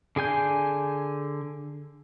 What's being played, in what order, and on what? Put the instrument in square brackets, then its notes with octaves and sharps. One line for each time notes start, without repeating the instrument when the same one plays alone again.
[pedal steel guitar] D3 G#4 G#5 G6